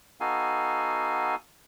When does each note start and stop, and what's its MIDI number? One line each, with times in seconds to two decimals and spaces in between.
0.21 1.35 59
0.21 1.35 63
0.21 1.35 66
0.21 1.35 69
0.21 1.35 77
0.21 1.35 80